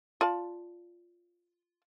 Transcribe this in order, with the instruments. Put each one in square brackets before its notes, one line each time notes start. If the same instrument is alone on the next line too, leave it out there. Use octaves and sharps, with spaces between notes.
[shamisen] F4 D5 A5